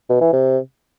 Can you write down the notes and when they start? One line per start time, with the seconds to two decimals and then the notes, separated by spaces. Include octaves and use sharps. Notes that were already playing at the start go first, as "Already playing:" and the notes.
0.09 B2
0.21 E3
0.33 C3